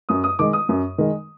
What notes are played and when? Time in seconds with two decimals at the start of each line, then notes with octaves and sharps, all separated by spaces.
0.09 F#2 D#6
0.24 D#6
0.39 D#3 G#3 D6
0.53 D#6
0.69 F#2
0.98 D#3 G#3